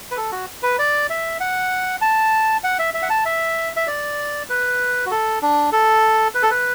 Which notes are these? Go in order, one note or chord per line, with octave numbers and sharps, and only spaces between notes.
B4
A4
F#4
B4
D5
E5
F#5
A5
F#5
E5
E5
F#5
A5
E5
E5
D5
B4
F#4
A4
D4
A4
B4
A4
B4